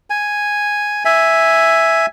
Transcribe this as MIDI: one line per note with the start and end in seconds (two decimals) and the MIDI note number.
0.10 1.04 80
1.05 2.06 76
1.05 2.06 80